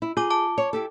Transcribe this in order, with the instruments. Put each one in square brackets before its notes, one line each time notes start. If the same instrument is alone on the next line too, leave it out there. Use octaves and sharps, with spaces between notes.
[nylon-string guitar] E4
[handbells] F4 D6 [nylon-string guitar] G#4
[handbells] A5 D6
[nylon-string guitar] C#5
E4 G4 A4